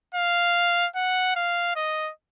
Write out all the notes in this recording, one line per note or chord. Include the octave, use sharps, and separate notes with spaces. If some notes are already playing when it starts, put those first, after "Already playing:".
F5
F#5
F5
D#5